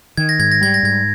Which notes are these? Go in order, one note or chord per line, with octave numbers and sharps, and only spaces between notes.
D#3 G#6
A#6
G#2 G#6
A#6
G3 G#6
A#6
G#2 G#6